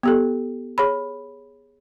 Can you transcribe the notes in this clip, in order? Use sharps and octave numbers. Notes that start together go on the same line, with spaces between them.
B3 G4 A4
G#4 C#5 B5